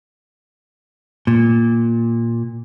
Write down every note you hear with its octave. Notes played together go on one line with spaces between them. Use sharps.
A#2